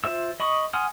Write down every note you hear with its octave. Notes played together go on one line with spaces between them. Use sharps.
F4 C5 E5 E6
D#5 B5 C#6 D#6
F#5 G#5 C6 D#6 F6